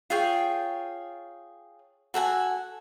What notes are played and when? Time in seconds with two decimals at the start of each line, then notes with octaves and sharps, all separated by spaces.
0.10 F4 G#4 C#5 G5
2.14 F#4 A4 F#5 G#5